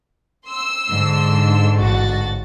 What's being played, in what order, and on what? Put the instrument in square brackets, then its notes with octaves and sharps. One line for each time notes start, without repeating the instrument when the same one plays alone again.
[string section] C6 E6
[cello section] G#2 D3
[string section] A1 F#4 A6